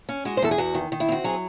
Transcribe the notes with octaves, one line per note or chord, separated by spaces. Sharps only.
C#4
G#3 F#4
C5
E2 A4
G#4
E2 F#4
D#3
D#3
E4
C4 F#4
F#3 G#4